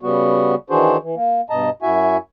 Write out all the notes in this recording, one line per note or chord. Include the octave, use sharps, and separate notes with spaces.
C#3 G3 B3 F#4
D#3 E3 D4 F#4 G#4 C5
E3
A#3
G2 B2 D#5 A5 A#5
F#2 E4 F#4 E5 G#5